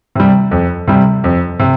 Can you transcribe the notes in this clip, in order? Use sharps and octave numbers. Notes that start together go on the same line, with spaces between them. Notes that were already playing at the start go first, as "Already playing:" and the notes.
C3 G3
F2
C3 G3
F2
C3